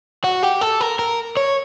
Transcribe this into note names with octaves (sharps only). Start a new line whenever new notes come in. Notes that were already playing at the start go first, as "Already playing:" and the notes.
F#4
G4
A4
A#4
A#4
C#5